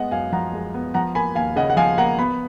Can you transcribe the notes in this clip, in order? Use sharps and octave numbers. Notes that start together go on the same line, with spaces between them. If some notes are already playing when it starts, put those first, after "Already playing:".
Already playing: G#3 B3 D#5 F#5
F#2 F5 G#5
F3 F#5 A#5
G#3
B3
F3 F#5 A#5
A#3 G#5 B5
D#2 F5 G#5
C#3 D#5 F#5
F#5
F3 F5 G#5
A#3 F#5 A#5
B3 B5